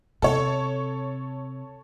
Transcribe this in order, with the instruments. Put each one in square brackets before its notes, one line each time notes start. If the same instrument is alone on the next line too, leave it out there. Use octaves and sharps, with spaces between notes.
[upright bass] C3 [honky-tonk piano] A4 C#5